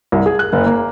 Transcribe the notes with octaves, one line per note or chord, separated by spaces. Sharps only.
C2
G#4
F#6
F#1
A#3